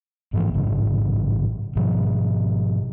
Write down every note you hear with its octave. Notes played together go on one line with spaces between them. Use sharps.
G#2 E3 F3 A#3
A1 G#2 C#3
G#2 B2 F3